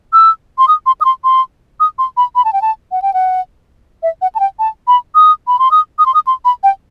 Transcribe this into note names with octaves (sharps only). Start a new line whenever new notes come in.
E6
C6
D#6
C6
D#6
C6
C6
D#6
C6
B5
B5
A5
G5
A5
F#5
G5
F#5
E5
F#5
A5
G5
A5
B5
D#6
B5
C6
D#6
D#6
C6
D#6
C6
B5
G5